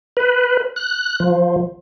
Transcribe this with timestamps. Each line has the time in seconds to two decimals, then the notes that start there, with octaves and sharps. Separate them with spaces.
0.17 B4
0.76 F#6
1.20 F3